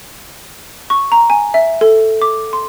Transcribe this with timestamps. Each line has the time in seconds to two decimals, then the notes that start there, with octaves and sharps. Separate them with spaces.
0.90 C#6
1.12 A#5
1.30 G#5
1.54 E5
1.81 A4
2.22 D6
2.53 C6